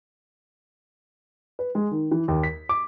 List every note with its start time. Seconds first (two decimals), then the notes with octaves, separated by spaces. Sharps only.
1.59 B4
1.75 G#3
1.91 D#3
2.11 E3
2.28 D#2
2.43 B6
2.69 D6